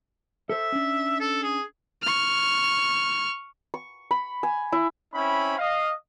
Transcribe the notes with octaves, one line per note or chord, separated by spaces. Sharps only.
A4 C5 E5
C#4 D4
A4
G#4
C#6 F6
C#6
B5
G#5
E4
C4 C#4 E4 B5
D#5 F5